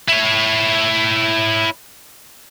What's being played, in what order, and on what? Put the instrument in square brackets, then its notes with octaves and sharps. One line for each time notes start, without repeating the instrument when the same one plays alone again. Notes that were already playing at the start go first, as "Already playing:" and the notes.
[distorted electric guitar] E4 C#5